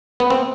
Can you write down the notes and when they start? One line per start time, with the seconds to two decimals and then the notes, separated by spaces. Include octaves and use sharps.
0.20 B3
0.30 C4